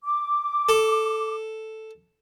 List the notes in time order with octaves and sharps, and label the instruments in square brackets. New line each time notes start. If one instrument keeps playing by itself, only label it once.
[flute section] D6
[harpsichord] A4